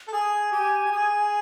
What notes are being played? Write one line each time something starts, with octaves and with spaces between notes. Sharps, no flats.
A4
G#4 G#5
G4
G4
G#4